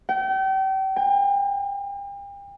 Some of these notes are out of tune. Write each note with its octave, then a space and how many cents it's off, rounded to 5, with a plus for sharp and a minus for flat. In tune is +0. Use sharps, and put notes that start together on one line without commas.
G5 -35
G5 +40